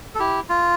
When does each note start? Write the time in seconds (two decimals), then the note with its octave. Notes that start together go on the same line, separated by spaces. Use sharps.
0.15 A4
0.19 E4 G4
0.49 F4